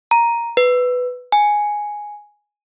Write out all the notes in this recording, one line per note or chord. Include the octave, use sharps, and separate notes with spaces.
A#5
B4
G#5